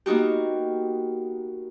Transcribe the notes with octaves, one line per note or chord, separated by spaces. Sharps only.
A#3 B3 D#4 F#4 G4